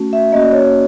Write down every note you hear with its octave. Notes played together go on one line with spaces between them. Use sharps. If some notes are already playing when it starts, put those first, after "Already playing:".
Already playing: A3 C#4 F#4
E5
A#3 C#4 F#4 D#5
D5
C#5